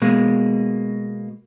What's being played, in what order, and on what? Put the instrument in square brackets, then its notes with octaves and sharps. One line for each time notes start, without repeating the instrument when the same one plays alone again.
[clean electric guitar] B2 G#3 A#3